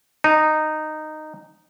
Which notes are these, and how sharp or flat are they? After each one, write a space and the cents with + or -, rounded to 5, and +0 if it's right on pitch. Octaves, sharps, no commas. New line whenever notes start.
D#4 -10